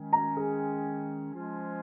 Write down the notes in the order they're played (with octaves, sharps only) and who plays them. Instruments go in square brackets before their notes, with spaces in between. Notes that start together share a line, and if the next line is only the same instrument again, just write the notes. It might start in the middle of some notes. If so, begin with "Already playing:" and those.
Already playing: [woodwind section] D#3 G#3 C#4
[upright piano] A#5
G#4
[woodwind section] F3 G#3 C#4 F4